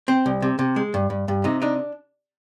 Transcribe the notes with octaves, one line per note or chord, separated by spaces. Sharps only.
C4
C2
C3
C3
G#3
G2
G2
G2
C3 D#4
D4 D#4